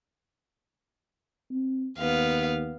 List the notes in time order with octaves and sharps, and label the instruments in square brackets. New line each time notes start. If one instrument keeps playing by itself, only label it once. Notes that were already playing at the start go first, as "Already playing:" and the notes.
[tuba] C4
[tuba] D#2 [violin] B3 F5